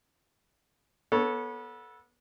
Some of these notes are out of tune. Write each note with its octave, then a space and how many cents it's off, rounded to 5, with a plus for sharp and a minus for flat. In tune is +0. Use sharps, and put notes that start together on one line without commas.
B3 -25 A4 +0 C#5 +0